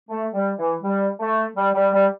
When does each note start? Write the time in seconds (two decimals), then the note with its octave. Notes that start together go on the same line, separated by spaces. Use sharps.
0.09 A3
0.33 G3
0.58 E3
0.82 G3
1.19 A3
1.56 G3
1.75 G3
1.93 G3